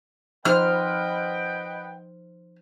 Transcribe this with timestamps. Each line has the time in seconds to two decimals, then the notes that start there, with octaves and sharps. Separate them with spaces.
0.45 F3 D#4 B4 C5 D#5 F#5 G5 F6